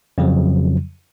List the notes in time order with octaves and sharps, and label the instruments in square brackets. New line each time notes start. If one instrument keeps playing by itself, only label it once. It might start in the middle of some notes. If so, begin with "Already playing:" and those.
[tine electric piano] F2 C#3 F3 F#3